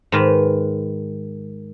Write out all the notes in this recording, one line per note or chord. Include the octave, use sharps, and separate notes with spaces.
G#2 D#3 B4